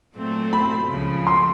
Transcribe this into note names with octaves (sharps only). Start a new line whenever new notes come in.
A#2 F#3 A3 C4
B5
C#2 C#3 F3
C6